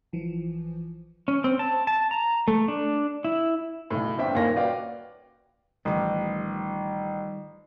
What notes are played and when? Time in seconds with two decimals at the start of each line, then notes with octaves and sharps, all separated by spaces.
0.13 A#1 E3 F3
1.28 C#4
1.44 C4
1.59 A5
1.87 A5
2.11 A#5
2.48 A3
2.68 D4
3.24 E4
3.90 B1 A2
4.18 G1 D3 C4 D4 E5 G5
4.34 D#1 D#2 A#2 F4 C#5 A#6
4.55 F#4 B4 D5 F5 G5
5.85 A1 D#3 F3 G3